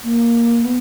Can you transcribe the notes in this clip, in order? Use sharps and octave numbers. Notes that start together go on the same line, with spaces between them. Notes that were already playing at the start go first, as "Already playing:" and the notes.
A#3
B3